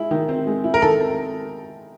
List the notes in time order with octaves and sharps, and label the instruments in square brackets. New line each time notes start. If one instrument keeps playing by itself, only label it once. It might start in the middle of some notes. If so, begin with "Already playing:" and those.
Already playing: [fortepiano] G#3 E4
D#3
C4
G#3
E4
[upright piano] A#4
[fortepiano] D#3 [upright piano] A4
[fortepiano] C4